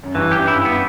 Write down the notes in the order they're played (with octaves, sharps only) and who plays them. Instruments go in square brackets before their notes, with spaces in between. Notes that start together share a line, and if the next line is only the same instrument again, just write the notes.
[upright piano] F#2
[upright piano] G2 [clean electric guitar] E3
[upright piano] F#2 [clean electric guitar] G4
[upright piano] G2 [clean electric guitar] E4
[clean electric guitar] B3